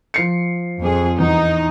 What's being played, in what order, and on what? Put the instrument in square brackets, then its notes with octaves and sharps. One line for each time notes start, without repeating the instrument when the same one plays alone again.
[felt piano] F3 C7 C#7
[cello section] F2 G#4
[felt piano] E2 [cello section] D#4